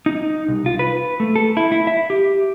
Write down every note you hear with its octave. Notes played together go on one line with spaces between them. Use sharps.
D#4
C2
F4
B4
A3
A4
E4
E4
E5
G4